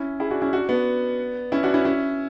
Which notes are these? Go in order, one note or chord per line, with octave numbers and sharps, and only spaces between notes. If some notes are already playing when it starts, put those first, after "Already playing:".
Already playing: C#4 E4
E4 G#4
D4 F#4
C#4 E4
D4 F#4
B3 D4
C#4 E4
D4 F#4
C#4 E4
C#4 E4